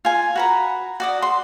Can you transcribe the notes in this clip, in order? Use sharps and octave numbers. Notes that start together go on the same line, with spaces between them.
F4 G#5
F#4 B4 A#5
F#4 D5 D#6
F#4 C6